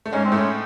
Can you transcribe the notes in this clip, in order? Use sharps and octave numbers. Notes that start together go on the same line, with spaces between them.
A3
G#2 G#3 C#4
C4
A2 A3 C#4